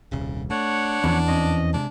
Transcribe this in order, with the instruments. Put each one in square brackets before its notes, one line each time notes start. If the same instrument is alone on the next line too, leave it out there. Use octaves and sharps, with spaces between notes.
[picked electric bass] D#1 C2 [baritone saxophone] C#3
[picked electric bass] A3 [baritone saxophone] D4 [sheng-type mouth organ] C#5 F#5
[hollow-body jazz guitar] E2 [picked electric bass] F3 B3 C#4
[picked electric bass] F2 C4 C#4 [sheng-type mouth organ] D#5
[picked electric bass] C3 G#3 [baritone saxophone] D4